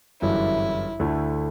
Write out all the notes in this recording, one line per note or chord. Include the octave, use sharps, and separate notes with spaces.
G1 F#2 E3 E4
D2 D3 A3 E4